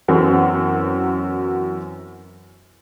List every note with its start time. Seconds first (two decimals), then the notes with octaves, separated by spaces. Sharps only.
0.08 F#2 E3 F#3 B3 C4 F#4